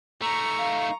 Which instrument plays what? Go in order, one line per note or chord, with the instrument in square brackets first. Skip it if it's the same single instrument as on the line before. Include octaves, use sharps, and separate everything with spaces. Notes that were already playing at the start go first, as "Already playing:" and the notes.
[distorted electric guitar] A3 D#4 [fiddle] A#5 [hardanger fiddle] C#6
[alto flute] F5